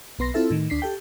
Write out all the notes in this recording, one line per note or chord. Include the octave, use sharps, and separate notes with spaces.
B1 B3 C6 A#6
C4 E4 F4 A4 E5
A2 D#3
D2 D4 B6 C7
G4 A4 G5